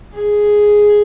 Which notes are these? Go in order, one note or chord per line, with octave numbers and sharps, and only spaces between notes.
G#4